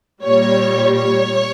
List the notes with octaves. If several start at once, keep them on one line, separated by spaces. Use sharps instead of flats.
A#2 G3 C#5
C#5